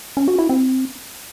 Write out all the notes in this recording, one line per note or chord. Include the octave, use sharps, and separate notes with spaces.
C#4
F#4
E4
C4